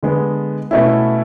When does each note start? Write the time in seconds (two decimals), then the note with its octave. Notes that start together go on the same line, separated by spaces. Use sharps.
0.03 D3 G#3 B3
0.71 B2 A3 C#4 E4